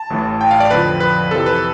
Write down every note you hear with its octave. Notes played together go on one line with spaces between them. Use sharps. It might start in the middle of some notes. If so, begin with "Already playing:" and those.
Already playing: A5
A1 A2 E3
G5
F5
D5
F2 D3 F3 B4
B4
F2 C3 E3 A4
B4